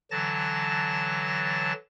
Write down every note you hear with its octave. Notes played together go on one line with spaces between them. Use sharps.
D3 E3 F#3 A5 A6 A#6